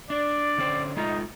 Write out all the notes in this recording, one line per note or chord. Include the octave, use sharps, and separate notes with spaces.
D4 D5
D3 C#4 C5
G#3 A3 D#4 F4